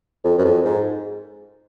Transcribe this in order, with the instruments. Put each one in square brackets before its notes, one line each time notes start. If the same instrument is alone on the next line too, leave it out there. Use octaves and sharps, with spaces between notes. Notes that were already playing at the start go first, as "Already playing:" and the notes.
[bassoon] F2
F#2
F2
G#2